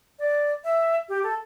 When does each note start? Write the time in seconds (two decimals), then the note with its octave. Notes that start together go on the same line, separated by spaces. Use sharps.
0.19 D5
0.64 E5
1.09 G4
1.23 A4